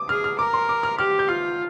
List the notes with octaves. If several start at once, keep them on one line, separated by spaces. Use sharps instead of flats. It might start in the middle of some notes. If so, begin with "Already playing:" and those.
Already playing: D6 D#6
G#4 F6
F6
A#4 D6
C6
D6
F6
G4 F6
G6
F4 F6